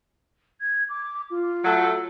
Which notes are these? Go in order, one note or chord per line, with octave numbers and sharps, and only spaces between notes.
G#6
D6
F4
F#3 A3